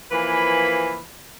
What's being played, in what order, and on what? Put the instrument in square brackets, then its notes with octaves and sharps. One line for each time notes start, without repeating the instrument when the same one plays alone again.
[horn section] E3 F3 A#3 B4 G#5 B5